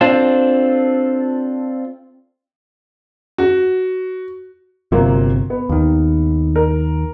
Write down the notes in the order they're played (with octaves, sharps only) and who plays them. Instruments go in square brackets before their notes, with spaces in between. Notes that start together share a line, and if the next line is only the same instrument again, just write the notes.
[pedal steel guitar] C4 D4 F4 A4
[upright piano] F#4
[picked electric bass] G1 C3 [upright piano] F#3 A#3 F4
[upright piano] B3
[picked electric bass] D#2 D#3
[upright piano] A#4